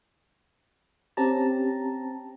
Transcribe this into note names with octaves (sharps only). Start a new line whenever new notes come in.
C4 C#4 G4 A5 A#5